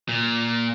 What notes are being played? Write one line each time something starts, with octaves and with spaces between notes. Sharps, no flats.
A#2